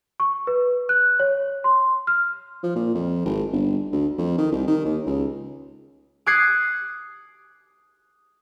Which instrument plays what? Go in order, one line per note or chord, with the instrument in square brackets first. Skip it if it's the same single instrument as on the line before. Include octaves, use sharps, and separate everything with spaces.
[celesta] C#6
B4
F#6
C#5
C6
F6
[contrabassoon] F3
A#2
F2
G#1
G1
D2
F2
D#3
C2
D#3
D#2
C#2
[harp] D6 D#6 F#6 G#6 C7 C#7